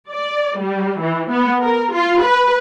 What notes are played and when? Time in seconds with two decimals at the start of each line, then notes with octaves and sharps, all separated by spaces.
0.10 D5
0.57 G3
1.00 E3
1.29 B3
1.60 A#4
1.93 F4
2.21 B4